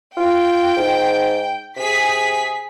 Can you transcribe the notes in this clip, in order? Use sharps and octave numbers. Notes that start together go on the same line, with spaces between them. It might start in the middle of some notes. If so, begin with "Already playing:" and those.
F4 G5
G#2
C3 G#4 B6